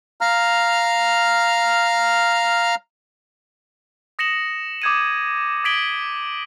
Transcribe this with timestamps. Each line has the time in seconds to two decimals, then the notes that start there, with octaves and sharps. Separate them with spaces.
0.21 F5 A#5 F6
4.19 D#6 A#6 C#7 E7 F#7
4.82 D6 D#6 G6 G#6 C#7 D#7
5.64 D#6 G#6 B6 D7 F#7 G7